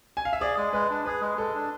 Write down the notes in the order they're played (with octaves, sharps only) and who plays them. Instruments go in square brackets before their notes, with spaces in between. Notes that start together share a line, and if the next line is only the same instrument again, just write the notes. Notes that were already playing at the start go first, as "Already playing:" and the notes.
[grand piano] G#5
F5
E5
[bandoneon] G#4 [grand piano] D5
[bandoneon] G#3
[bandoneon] G#3 [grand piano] B4
[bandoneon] D4
[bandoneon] G#4 [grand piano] B4
[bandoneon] G#3
[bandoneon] G#3 [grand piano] A4
[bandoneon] D4